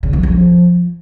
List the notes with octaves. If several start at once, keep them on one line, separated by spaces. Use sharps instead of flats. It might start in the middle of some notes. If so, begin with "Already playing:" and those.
C#3
F#3
F3